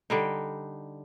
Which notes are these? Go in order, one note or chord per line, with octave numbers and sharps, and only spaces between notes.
D3 G3 D#4